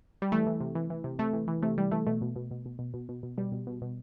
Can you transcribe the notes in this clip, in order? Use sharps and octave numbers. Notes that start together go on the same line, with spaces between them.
G3
E3 A3
E3
C3
E3
E3
C3
C3 A3
E3
E3
C3 A3
E3 G3
E3 A3
B2 A3
B2
B2
B2
B2
B2
B2
B2
B2
B2 G3
B2
B2
B2